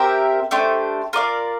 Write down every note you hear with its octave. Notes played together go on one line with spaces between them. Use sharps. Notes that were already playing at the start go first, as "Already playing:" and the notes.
Already playing: C4 G4 A#4 E5
A3 D4 G4 C5
F4 A#4 D5 F5